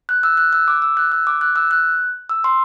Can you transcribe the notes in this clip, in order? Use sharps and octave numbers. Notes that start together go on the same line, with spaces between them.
F#6
E6
F#6
E6
D6
E6
F#6
E6
D6
F#6
E6
F#6
E6
C6